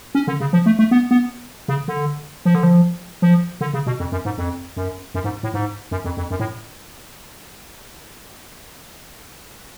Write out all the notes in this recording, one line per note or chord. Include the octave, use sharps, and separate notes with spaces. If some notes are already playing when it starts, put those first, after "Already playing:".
C#4
D3
C#3
F3
A3
A3
B3
B3
C#3
D3
F3
D3
F3
F3
D3
C#3
B2
F2
F#2
G#2
F2
F#2
F#2
G#2
A2
G#2
F#2
F2
F2
F#2
A2